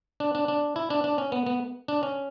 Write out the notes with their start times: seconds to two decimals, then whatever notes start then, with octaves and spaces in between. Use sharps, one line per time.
0.20 D4
0.35 D4
0.48 D4
0.76 E4
0.90 D4
1.04 D4
1.18 C#4
1.32 B3
1.46 B3
1.88 D4
2.03 C#4